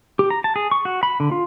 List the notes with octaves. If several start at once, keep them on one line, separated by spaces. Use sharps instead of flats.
G4
A#5
A5
G#4
C#6
F#4
B5
D3
F4